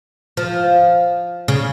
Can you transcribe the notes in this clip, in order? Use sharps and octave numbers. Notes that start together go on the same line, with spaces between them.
F3
C#3